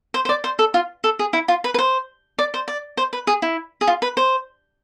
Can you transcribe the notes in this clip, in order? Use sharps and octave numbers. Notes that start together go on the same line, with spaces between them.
C5
C5
D5
C5
A4
F4
A4
G#4
E4
F4
B4
B4
C5
D5
C5
D5
C5
B4
G#4
E4
G#4
F4
B4
C5